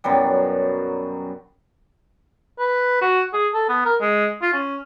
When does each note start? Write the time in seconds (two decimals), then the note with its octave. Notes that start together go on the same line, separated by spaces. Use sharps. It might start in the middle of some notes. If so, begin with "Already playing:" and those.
0.04 F#2 B2 F#3 G3
2.59 B4
3.01 F#4
3.33 G#4
3.54 A4
3.69 B3
3.85 A#4
4.01 G#3
4.42 F4
4.53 C#4